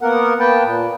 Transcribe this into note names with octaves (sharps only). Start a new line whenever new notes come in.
A#3 B3 A#4 F#5
A#3 B4 G5 A5
A#2